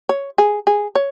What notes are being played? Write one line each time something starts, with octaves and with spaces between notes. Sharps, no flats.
C#5
G#4
G#4
C#5